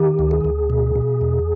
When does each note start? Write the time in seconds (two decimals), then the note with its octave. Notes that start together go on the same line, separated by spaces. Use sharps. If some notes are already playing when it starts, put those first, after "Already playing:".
Already playing: D#3 G4
0.19 D2
0.31 G#4
0.45 D2
0.70 B2
0.96 B2
1.21 E2